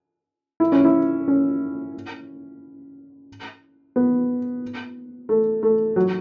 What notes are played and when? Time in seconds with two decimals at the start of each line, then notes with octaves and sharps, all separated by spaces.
0.60 E4
0.72 C#4
0.85 E4
1.28 C#4
3.96 B3
5.29 A3
5.63 A3
5.96 F#3